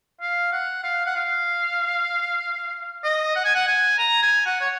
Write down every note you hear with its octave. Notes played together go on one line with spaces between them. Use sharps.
F5
F#5
F5
F#5
F5
D#5
F#5
G#5
F#5
G#5
A#5
G#5
F#5
C#5